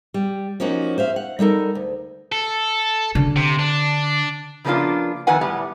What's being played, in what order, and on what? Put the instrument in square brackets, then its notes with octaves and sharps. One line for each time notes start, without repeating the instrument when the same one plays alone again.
[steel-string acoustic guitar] G3
F3 A#3 C#4 D#4 F#4
C5 E5 F5
F#5
G3 D#4 A4 A#4
D2
[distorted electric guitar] A4
[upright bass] D3
[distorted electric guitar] C3
D4
[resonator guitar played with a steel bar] C#3 F3 A#3 B3 D4 F4
F2 D#3 B3 B4 F#5 G#5
A2 G3 B3